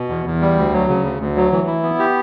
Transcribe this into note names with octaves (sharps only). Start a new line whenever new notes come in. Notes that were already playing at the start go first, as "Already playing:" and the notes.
Already playing: B2
E2
E2
G3
D2
F#3
C#3
D2
D2
F#3
E3
E4
B3
G4